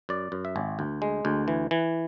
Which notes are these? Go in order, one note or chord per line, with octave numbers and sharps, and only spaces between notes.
F#2 D5
F#2
E5
G#1
D2
G#3
D2
E3
E3